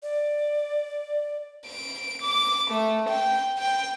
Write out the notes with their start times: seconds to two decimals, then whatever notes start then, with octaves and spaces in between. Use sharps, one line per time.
0.03 D5
1.66 D7
2.22 D6
2.70 A3
3.09 G5
3.58 G5